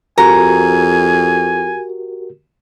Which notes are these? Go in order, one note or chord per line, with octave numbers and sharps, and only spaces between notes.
F2 F#4 G4 A#4 G#5 A#5